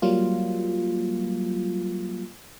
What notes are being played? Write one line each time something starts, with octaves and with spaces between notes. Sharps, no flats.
F#3 G3 A#3 F4